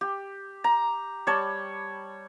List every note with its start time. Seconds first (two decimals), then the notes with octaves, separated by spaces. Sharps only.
0.01 G4
0.64 A#5
1.27 G3 C#5 A5